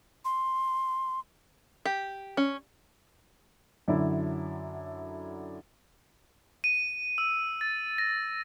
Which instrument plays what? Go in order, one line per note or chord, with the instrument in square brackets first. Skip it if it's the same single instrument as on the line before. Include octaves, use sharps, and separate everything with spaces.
[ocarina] C6
[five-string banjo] G4
C#4
[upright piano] F#2 D3 F#3 D4 E4
[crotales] D#7
E6
A6
A#6